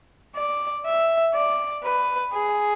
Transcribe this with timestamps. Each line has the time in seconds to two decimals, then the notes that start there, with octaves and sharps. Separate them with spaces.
0.36 D5
0.86 E5
1.35 D5
1.84 B4
2.34 G#4